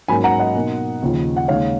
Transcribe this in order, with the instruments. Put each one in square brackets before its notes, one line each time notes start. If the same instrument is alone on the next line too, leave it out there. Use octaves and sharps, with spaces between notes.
[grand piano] G#2 F#3 A#3 C#4 G#5 B5
F#5 A#5
D#5 F#5
B2 A#3 D#4
D#2 C#3 F3
F#5
D#2 C#3 G#3 D#4 C#5 F5